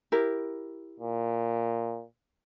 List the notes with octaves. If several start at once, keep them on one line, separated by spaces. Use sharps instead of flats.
E4 G4 A#4
A#2